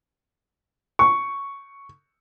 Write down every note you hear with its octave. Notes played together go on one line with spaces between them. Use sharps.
C#6